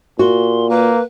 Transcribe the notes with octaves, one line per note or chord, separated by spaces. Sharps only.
A#2 F#4 C6
A#3 B4